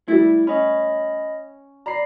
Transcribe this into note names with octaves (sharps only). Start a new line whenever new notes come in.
G3 A3 E4
C#4 D#5 B5
D5 A#5 B5 C7